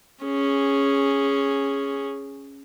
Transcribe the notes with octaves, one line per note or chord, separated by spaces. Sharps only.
C#4 G#4